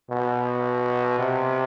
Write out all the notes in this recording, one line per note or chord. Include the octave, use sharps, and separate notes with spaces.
B2
C3